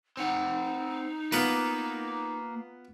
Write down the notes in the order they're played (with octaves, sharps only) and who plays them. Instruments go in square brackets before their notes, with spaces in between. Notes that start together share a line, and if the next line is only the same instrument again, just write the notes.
[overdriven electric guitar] C4 F#5 [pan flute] D#4
[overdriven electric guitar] A#3 [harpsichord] B3 F4 B4